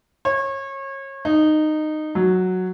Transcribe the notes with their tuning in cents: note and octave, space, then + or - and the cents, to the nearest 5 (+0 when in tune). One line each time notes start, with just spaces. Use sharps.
C#5 -30
D#4 -15
F#3 -5